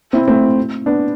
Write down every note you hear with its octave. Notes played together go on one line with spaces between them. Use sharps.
C4 E4
A3 C4
B3 D4